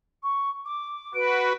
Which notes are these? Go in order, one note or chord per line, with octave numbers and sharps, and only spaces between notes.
C#6
D6
F#4 B4 D7